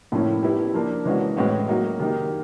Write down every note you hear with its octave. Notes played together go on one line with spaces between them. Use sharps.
A2 F3 A#3 C#4 E4
G3 B3 E4
F3 A#3 D4
E3 G#3 C#4 F#4
A2 E3 G#3 C#4 F#4
F#3 A#3 D#4 F#4
D#3 G3 A#3 D#4